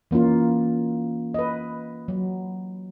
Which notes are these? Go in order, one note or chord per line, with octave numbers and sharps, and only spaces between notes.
E3 A#3 C#4 F4
B4 D#5
F#3